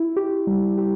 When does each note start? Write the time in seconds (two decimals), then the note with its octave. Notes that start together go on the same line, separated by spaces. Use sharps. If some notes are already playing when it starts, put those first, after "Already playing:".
Already playing: E4
0.17 G4
0.47 G3
0.78 G4